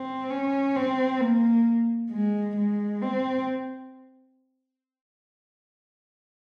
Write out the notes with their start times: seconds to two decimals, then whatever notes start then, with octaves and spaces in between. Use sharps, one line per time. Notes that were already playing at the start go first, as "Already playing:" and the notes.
Already playing: C4
0.30 C#4
0.75 C4
1.20 A#3
2.11 G#3
2.57 G#3
3.02 C4